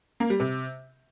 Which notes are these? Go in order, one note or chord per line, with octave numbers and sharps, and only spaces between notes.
A#3
G3
C3